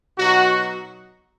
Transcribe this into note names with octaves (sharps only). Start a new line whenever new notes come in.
B2 F#3 D#4 F#4